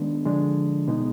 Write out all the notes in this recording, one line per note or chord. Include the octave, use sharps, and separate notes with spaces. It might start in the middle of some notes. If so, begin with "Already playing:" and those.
Already playing: D#3 G#3 B3 D4
D3 F3 G#3 D4
B2 G#3 B3 D#4